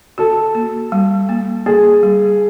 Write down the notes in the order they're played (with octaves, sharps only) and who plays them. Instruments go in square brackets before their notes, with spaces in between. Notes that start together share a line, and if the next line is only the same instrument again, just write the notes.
[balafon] F#4 [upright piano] A4
[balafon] A#3
G3
A#3
[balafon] A#3 [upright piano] G#4
[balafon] G3